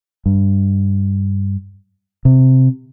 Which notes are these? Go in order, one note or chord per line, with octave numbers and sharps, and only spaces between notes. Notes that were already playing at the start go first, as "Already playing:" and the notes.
G2
C3